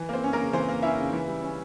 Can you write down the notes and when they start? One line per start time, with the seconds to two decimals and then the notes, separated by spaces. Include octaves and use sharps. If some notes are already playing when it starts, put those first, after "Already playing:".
Already playing: E3
0.09 A#3 C4 C5
0.23 C#4
0.33 A#3 A#4
0.38 C#3
0.53 E3 C4 C5
0.68 A#3
0.82 C#4 E4 E5
0.98 C#3
1.13 E3
1.28 G3
1.42 C#4